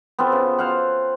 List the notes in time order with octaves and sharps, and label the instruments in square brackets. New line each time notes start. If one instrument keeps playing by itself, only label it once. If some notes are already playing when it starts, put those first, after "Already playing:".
[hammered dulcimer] B3 C4 F4 A4
C#3
C5 F5 F#5